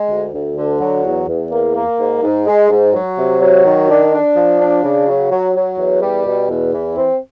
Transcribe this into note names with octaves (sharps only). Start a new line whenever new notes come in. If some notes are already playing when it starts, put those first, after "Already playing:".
Already playing: G#3
D2
D2
D3
F#3
E2
E2
A#3
A#3
G#2
G#2
G#3
G#2
F#3
C3
F#3
D#3
D4
D4
F3
D4
C#3
F#3
F#3
F#3
E2
G3
B2
E2
E3
C4